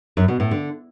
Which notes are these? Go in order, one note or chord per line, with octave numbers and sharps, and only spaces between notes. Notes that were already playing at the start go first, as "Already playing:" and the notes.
F#2
B2
A2
D3